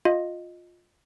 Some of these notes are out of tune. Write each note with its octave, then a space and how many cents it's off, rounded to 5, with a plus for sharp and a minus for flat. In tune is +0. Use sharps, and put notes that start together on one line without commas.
F4 +15 D#5 +0